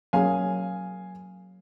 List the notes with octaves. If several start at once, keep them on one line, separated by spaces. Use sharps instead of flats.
F#3 A#3 C#4 G#4 F5 G#5